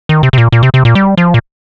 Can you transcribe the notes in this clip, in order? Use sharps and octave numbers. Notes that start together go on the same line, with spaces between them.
D#3
C3
C3
A#2
A#2
C3
C3
A#2
G3
F3
A#2